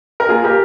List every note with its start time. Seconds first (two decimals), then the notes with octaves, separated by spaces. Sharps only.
0.20 A#4
0.29 A#3 F4 G#4
0.44 A#3 G4 A#4